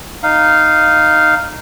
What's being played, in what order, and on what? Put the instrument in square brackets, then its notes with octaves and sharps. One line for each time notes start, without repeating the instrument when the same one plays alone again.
[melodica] D#4 F5